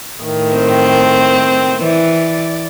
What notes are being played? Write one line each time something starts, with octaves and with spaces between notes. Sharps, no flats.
A2 D#3 A3
C4
E3 D5